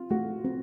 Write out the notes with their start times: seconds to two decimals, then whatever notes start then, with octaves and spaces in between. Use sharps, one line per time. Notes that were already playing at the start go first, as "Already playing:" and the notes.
Already playing: C4 F4
0.10 A3 F#4
0.44 C4